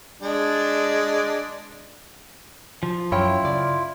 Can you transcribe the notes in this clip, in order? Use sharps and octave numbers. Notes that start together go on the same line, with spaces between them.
G#3 D4
F3
F#2 E4 F4 C#5 G5
C#3 D5